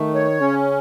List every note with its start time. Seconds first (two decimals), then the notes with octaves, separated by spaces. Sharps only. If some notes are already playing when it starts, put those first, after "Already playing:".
Already playing: D#3 A3
0.14 C#5
0.41 C#3 C#4